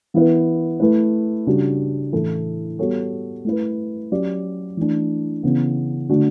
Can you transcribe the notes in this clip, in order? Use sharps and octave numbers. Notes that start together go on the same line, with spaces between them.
E3 B3 E4 B4
A3 E4 B4
C#3 G3 D4 F#4
A2 E3 A3 E4 A4
G3 B3 F#4 A4 C#5
A3 E4 B4
F#3 C#4 G4 D5
E3 A3 D4
C#3 E3 B3
D3 A3 D4 F#4